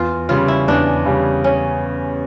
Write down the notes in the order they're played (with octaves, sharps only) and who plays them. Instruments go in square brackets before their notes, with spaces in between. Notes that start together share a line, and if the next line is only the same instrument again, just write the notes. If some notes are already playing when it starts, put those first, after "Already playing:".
Already playing: [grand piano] E2 [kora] F4
[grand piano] C#3 G3 C#4 [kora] F4
[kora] E4
[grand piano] E2 [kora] D4
[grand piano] C#3 G3 C#4
[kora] C#4